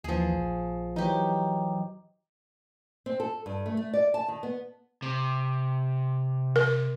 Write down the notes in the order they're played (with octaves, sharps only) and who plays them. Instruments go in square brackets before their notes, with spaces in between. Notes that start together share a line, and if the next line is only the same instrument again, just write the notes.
[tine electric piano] D#2 E3 [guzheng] F3 G#4
[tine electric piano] A#1
[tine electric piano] E3 F#3 [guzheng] D#4 G4
[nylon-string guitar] C4
A4
G2
A3
A3
D5
A5
D#3
B3
[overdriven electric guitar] C3
[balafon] A#4